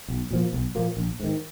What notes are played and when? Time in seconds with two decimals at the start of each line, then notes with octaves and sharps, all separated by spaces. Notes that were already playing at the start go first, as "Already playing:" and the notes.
0.08 B1
0.31 A#2 F3 A#3
0.53 B1
0.75 A#2 F3 A#3
0.97 A#1
1.20 G#2 D#3